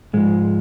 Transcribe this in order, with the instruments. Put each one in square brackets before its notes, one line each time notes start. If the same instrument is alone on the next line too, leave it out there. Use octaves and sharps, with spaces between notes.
[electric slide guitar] G#2 F3 G#3